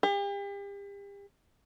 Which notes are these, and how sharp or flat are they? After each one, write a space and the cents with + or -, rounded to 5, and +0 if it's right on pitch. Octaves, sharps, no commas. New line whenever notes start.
G4 +40